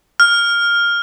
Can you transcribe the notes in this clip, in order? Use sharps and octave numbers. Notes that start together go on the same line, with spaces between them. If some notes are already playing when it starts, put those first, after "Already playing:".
F6